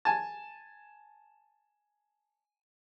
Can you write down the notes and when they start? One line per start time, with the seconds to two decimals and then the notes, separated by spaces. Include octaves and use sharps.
0.05 G#5 A5